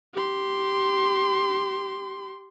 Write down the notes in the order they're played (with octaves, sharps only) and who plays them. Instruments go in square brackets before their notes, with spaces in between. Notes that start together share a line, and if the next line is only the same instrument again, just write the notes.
[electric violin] G4 C6